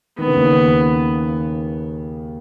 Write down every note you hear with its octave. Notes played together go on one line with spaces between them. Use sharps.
D#3 B3
C#3
D#2 D#3